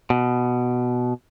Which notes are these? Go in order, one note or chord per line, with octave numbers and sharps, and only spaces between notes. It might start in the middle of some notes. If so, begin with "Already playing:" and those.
B2